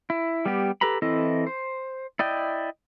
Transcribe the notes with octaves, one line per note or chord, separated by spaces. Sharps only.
E4
G3 B3 G4
G4 A4 B4 A#5 B5
E3 C4 E4 A4 D#5
C5
E4 D5 D#5 G5